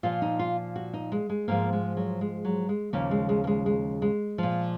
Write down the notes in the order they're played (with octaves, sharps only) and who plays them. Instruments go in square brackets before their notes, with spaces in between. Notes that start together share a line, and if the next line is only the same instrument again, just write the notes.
[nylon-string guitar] A#2 F3 F4
D#4
F4
F#4
D#4
G#3
G#3
G#2 F3 A#3
G#3
F#3
G#3
F#3
G#3
D#2 C#3 F3 A#3
G#3
G#3
A#3
G#3
G#3
G#3
A#2 F3